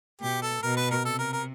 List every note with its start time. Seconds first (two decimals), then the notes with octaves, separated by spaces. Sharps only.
0.21 B2 G4
0.42 A4
0.63 B2 A#4
0.77 B4
0.91 A#4
1.05 C3 A4
1.19 A#4
1.33 A#4